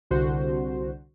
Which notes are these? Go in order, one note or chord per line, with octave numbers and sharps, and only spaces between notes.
C2 D3 F#4 C5